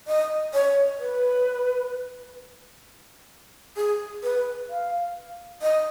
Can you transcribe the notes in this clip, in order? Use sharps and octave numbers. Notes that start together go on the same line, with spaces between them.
D#5
C#5
B4
G#4
B4
F5
D#5